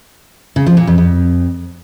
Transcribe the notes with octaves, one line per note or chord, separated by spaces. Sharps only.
C#3
F3
A#2
F2
F2